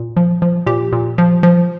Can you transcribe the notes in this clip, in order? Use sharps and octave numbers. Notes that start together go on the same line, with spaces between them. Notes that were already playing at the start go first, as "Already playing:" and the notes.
Already playing: A#2
F3
F3
A#2 G4
A#2
F3
F3